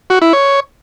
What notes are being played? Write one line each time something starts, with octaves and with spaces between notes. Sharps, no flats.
F#4
E4
C#5